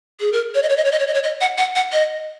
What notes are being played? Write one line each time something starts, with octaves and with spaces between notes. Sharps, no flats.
G#4
A#4
C#5
D#5
C#5
D#5
C#5
D#5
C#5
D#5
C#5
D#5
F#5
F#5
F#5
D#5